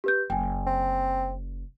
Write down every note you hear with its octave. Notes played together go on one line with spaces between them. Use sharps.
G4 B4 G6
F#1 G5 G#5
C4